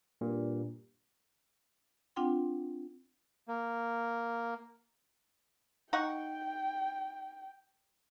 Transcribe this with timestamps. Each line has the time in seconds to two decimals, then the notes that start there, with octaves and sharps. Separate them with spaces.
0.21 G2 A#2
2.16 C4 D4 F4 F#5 G5 C6
3.48 A#3
5.93 D#4 F#5 G5 C#6